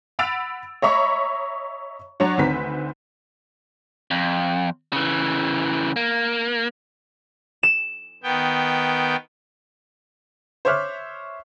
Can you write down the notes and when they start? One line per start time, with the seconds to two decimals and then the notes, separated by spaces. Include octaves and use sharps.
0.19 F#5 B5 E6 A6 D7 F7
0.82 C#5 D#5 E5 A#5 B5 C#6
2.20 F#3 D4 C#5 F#5
2.38 D2 D#3 C4 B4 B6
4.11 F2
4.93 C#3 E3
5.96 A#3
7.63 E7
8.23 D#3 B3 G5
10.65 C5 C#5 E5 D6 F6 F#6